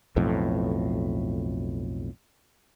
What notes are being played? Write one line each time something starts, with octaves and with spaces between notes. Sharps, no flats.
B1 F2 A2